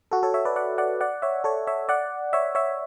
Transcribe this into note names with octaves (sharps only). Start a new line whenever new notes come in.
F#4 A4
A4 C#5
C#5 E5
B4 D5
D5 F#5
D5 F#5
D5 F#5
C#5 E5
A4 C#5
C#5 E5
D5 F#5
C#5 E5
C#5 E5